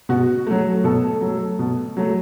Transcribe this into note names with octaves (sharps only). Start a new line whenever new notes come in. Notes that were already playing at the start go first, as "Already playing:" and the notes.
B2 F#4
F#3 A3
B2 A4
F#3 A3
B2
F#3 A3